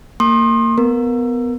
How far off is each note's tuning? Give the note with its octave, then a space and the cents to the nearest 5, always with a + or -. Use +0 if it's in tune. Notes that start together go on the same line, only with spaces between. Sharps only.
A#3 -30 C6 +30 D#6 -30
B3 +15 A#4 +0